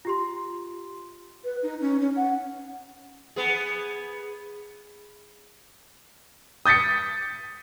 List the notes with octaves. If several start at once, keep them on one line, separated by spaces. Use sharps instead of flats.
F4 G4 C6
B4
D#4
C#4
C#4
F#5
B3 G#4
D#6 G6 A6 B6 C#7